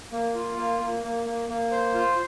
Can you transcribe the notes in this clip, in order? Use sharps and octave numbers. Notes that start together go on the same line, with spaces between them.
A#3
F4
A#3
A#3
A#3
A#3
A#3
C5
F4